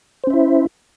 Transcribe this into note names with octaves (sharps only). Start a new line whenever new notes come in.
C#4 E4 C5 E5